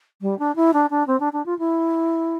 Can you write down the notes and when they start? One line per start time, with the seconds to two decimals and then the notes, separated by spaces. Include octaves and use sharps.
0.21 G3
0.39 D4
0.55 E4
0.73 D4
0.90 D4
1.07 C4
1.20 D4
1.33 D4
1.46 F4
1.59 E4